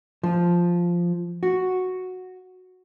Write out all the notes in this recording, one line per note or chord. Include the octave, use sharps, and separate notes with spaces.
F3
F#4